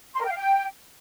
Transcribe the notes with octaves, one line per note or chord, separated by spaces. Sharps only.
C6
A#4
G5
F5
G5